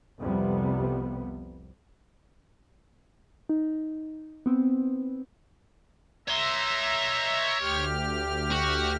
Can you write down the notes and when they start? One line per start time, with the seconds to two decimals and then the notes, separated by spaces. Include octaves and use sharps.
0.20 C2 F2 C3 G3 B3
3.49 D#4
4.46 B3 C4
6.28 C#5 E5 A#5 C6
7.60 D2 G4 F6
8.52 F#4